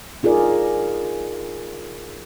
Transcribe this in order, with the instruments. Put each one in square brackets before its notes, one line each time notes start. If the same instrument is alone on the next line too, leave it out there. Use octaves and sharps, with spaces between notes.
[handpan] D#4 F4 G#4 A#4 D5